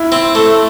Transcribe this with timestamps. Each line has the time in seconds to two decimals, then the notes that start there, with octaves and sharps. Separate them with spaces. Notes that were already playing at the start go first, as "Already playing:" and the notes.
Already playing: E4
0.12 C4
0.35 A3